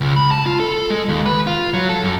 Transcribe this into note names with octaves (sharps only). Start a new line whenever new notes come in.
C#2
B5
A5
F4
A4
G#3
D#2
B4
F4
F#3
A4
F#2